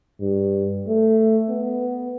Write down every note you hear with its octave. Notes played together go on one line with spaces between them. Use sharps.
G2
A3
B3